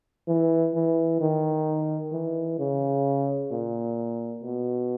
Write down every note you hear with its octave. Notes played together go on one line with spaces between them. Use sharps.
E3
E3
D#3
E3
C#3
A#2
B2